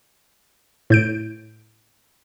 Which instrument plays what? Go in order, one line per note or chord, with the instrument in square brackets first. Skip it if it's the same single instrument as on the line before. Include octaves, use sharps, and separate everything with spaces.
[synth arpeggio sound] A2 G6 D7